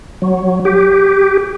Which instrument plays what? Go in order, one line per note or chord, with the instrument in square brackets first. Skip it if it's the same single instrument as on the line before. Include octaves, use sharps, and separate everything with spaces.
[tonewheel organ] F#3
G4